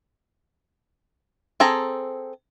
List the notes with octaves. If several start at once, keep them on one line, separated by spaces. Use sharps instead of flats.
C4 G#4 A4 A#5